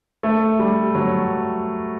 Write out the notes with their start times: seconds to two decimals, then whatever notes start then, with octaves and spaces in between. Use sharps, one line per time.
0.23 A3
0.59 G3
0.95 F#3